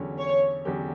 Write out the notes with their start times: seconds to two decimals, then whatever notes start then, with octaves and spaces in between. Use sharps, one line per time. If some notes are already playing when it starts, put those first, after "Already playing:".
Already playing: E2 D3 F#3 C#4 G4
0.19 C#5
0.65 E2 D3 F#3 C#4 G4